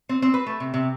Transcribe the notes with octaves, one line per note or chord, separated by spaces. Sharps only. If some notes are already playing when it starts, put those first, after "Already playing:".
C4
C4
B4
A3
C3
C3